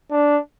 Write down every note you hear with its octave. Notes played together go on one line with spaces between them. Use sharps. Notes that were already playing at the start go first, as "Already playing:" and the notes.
D4